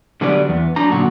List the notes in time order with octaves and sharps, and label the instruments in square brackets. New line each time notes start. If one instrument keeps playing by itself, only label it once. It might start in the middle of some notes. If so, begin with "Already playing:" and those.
[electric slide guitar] D3 F#3 G3 B3 B4 D5
E2 B3
F#3 D4 A#5
F#2 A#2 D3 F#4